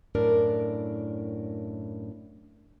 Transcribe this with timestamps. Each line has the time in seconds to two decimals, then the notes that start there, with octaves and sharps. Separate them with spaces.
0.15 F#2 A2 D4 A#4 D5